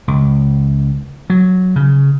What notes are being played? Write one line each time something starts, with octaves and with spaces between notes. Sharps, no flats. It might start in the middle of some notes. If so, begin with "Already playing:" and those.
C#2
F#3
C#3